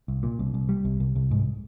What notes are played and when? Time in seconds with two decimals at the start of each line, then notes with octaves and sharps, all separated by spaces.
0.08 C2
0.23 A#2
0.39 C2
0.54 C2
0.69 G3
0.85 C2
1.00 C2
1.16 C2
1.31 G#2